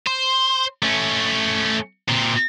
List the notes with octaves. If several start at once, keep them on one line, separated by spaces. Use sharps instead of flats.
C5
A3 C#4
A#2 C4